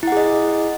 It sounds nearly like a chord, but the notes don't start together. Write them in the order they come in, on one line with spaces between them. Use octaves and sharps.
E4 F#5 G#4 D#5